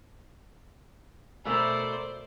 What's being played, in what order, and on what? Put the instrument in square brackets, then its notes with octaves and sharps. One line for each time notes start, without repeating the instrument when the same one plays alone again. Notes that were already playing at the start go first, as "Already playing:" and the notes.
[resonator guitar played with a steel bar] B2 A3 A#4 [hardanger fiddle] C5 D5 [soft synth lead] E6